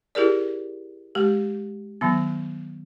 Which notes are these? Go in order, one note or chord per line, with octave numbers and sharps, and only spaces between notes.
E4 G4 G#4 A#4 D5
G#3 G4
D#3 F#3 B3